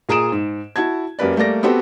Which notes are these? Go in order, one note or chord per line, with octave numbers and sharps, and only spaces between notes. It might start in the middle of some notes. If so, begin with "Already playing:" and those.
A#2 G#4 A#5 D#6 D7 E7
G#2
E4 F#4 A5 G#6
F#2 A#3 G4 B4 D5
G3 A3 A#3 D5 A#6
B3 C4 F#4 G4 A4 C5